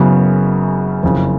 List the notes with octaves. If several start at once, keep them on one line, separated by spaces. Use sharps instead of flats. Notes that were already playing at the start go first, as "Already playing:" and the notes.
Already playing: F#1 F#2 C#3 F#3 B3
F#1 F2 C#3